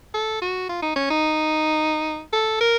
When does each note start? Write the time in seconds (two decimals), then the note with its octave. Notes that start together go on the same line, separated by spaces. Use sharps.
0.14 A4
0.42 F#4
0.69 F4
0.82 D#4
0.96 C#4
1.10 D#4
2.33 A4
2.61 A#4